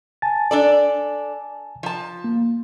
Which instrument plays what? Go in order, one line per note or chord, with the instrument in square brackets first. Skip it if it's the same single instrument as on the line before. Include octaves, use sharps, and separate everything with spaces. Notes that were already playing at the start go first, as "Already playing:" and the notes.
[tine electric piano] G#5 A5 A6
[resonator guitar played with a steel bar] D4 A4 D5
F3 A5
[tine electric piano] A#3